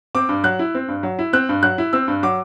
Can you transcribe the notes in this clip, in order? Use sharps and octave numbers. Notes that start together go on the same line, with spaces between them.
C4 D6
G2
F#3 F#6
E4
C4
G2
F#3
E4
C4 F#6
G2
F#3 F#6
E4
C4 E6
G2
F#3 D6